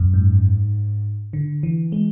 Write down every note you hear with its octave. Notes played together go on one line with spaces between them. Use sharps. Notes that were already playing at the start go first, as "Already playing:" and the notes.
Already playing: F#2
G#2
D3
E3
G#3